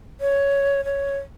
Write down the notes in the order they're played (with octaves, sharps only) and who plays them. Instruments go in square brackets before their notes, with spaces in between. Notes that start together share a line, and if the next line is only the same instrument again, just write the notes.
[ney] C#5
C#5